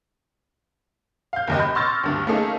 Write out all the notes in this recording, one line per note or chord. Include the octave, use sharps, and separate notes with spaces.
F5 G6
F#1 D#2 D#5
B5 G6
C6 C#6 E6 F6 A6 A#6
D2 G2
A3 A#3 C#4 D#4 G#4 A4